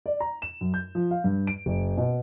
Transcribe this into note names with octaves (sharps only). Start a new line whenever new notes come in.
D5
A#5
E7
F#2
G6
F3
F5
G2
D7
F#1
B2